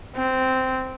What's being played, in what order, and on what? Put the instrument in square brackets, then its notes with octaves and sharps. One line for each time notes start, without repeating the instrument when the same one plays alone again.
[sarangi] C4